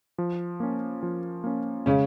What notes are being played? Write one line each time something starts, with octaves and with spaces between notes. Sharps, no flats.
F3
A#3 C#4
F3
A#3 C#4
C#3 G#3 C#4